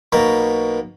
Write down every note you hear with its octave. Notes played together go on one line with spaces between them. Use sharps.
B1 B2 A#3 A#5